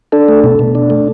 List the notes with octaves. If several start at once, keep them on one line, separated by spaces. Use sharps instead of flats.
D4 A4
A3
B2
B2
D4
A3